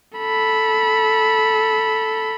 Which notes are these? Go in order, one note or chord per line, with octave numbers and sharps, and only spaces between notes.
A4 B5